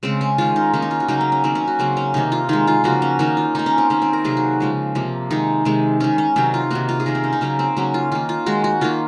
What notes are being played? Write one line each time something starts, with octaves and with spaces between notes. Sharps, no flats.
C#3 G#3 C4
C#4
D#3 G#3 F4
D#4
D#3 A#3 C#4
D#4
F4
F#4
C#3 F#3 A#3 D#4
C#4
C#4
D#3 F#3 A#3 C4
C#4
F#4
C#3 F#3 A#3 C4
C#4
C3 D#3 A#3 D#4
F4
D#3 G#3 D#4
F4
C#3 F3 A#3 F#4
C#4
D#3 A#3 D#4
F4
D#3 A#3 D#4
C#4
C4
D#3 A#3 C#4
C4
A#4
C3 F#3 A#3 G#4
F#4
C#3 F3 G#3
C3 F3 A#3
D#3 G#3 D#4
C3 D#3 G#3
D#3 G#3 C#4
C#4
C3 D#3 F#3 D#4
F4
C3 D#3 A#3 F#4
F4
G#4
C3 D#3 A#3 A#4
C4
C#4
D#4
C#3 F#3 A#3 C#4
C4
C#3 F#3 A#3 C#4
F4
D#3 A#3 F4
F4
D#3 G#3 F#4
F#4
D#3 A#3 F4